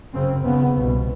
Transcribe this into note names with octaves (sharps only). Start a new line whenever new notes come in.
F#2 C#3 C4
D#2 C#3 B3
C2 B2